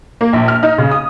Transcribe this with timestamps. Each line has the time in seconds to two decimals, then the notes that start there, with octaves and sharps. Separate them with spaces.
0.21 A#3
0.33 A#1
0.48 F6
0.63 D#4
0.78 C#3
0.91 D#6